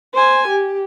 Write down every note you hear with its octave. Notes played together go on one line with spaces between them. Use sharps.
C5 G#5
G4